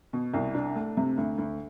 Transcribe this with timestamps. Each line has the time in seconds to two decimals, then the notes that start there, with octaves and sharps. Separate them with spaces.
0.13 B2
0.34 C2
0.54 D4
0.75 A3
0.97 C3
1.17 D2
1.38 D2